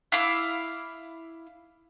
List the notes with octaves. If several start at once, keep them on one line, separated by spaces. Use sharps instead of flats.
E4 F5 D6 E6